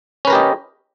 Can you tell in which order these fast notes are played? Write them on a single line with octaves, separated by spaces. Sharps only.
C#4 B4 A#4 G4 D#5